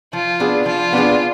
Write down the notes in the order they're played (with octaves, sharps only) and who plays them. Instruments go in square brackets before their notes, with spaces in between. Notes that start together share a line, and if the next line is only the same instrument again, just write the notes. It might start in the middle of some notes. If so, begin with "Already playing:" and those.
[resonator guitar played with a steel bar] F3 [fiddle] F4
[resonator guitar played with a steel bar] B3 D4 G#4
[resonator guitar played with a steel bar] F3 [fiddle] F4
[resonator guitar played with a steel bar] B3 D4 G#4